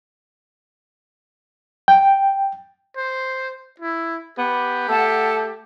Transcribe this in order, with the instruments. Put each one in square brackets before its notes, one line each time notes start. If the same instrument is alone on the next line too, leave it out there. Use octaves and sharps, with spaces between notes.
[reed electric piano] G5
[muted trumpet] C5
E4
[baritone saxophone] B3 [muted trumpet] G4
[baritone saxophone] A3 [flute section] F#5 A5